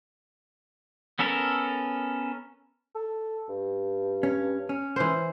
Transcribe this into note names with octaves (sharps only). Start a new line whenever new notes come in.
B3 C#4 A4 A#4
A4
G2
C#4
C#4
E3 C5